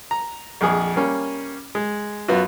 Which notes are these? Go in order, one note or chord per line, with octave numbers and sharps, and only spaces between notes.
A#5
A#1 F2 G#4
G3 A#3 C#4
G#3
F#2 B3 F4 F#4